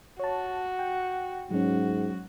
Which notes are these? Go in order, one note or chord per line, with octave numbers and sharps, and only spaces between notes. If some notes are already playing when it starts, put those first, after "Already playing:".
F#4 C#5 A5
G5
G#2 F#3 C#4 F#4